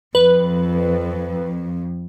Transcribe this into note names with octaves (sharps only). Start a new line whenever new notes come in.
F2 B4